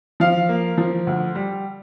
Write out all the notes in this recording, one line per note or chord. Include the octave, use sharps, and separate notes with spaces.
F3 F5
A#3
F3
D2
G3